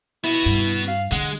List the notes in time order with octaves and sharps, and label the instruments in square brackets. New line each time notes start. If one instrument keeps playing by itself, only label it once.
[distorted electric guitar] B3 F#4 [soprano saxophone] E4
[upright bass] G2
[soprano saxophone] F5
[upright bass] D3 [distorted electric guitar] G#3 [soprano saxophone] F#5